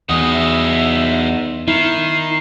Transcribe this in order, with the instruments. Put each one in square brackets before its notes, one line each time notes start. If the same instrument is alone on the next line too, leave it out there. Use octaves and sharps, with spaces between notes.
[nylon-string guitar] E2 [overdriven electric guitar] D#4 F#4 [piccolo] D#6
[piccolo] E5
[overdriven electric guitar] D#3 [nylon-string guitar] E4 [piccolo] C7